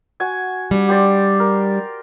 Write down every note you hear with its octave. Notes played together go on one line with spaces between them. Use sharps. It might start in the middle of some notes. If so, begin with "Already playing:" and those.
F#4 G#5
G3 D4
G4 C5 D5
A#4